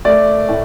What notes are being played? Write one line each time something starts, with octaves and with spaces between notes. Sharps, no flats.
A3 D5
A2